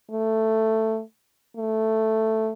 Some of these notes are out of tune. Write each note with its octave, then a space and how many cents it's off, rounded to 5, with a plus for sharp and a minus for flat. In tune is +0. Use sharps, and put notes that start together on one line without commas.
A3 +10
A3 +5